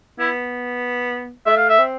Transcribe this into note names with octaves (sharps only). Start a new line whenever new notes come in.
B3 E4
A3 E5
F5
E5
C4